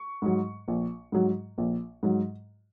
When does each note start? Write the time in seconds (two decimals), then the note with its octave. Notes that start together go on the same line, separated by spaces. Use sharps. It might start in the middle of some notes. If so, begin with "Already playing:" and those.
Already playing: C#6
0.22 G#2 F#3
0.68 A#1
1.12 G#2 F#3
1.58 A#1
2.03 G#2 F#3